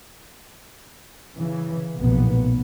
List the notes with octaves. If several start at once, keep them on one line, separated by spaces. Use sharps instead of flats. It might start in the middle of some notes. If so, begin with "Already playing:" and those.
C#3 E3
F1 B1 A#2 B3